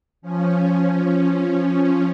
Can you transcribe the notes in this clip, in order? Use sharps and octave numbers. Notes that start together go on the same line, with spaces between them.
F3 C#4